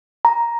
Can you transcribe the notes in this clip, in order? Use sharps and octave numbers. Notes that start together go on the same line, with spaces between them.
A#5